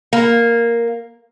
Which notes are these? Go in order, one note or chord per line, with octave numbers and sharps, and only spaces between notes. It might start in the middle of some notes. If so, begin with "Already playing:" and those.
A#3